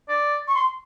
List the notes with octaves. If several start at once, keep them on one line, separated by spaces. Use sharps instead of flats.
D5
C#6
C6